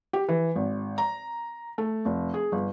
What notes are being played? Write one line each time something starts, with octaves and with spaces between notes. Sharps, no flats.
G4
E3
G#1
A#5
A3
F1
G#4
G1